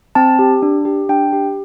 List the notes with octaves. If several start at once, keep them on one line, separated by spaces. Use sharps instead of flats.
C4 A5
G4
D4
G4
D4 G5
G4